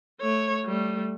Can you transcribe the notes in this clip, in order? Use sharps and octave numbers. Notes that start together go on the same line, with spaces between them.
A3 C#5
G3 A3